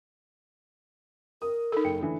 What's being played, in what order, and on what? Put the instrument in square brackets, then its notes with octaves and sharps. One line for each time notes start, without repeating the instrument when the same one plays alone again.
[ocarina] A#4 [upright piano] D#6
[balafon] D#4 A4
[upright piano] F#1 G5 C#7
D3 E3 A3